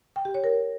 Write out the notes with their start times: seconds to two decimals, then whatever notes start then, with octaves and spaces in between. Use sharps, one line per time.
0.16 G5
0.25 G4
0.34 C#5
0.44 A#4